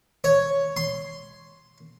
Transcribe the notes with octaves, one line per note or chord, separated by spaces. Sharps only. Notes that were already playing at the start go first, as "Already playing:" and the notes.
C#5
C6